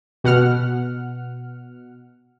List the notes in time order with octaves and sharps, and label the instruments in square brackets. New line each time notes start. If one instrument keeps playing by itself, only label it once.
[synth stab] B2 F#5 F6